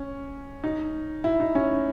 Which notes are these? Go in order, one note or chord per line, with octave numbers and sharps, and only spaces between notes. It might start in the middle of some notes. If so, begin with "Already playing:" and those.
Already playing: C#4
D#4
E4
D#4
C#4